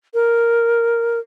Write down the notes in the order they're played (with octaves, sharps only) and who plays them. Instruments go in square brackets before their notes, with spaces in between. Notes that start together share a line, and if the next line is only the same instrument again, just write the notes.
[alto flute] A#4